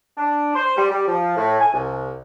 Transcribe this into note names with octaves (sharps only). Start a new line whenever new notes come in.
D4
C5
G3
G3
F3
A2
G#5
C2